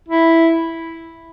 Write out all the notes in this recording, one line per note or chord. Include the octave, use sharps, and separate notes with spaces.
E4